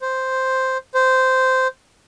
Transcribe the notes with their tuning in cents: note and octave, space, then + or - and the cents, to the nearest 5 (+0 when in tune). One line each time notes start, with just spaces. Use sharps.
C5 +0
C5 -10